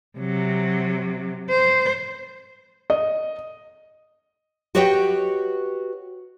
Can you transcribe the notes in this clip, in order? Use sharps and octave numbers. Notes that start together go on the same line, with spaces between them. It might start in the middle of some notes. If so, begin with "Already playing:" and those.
C3 F#3
C5
D#5
F#4 G4 B4 C#5 D#5 G5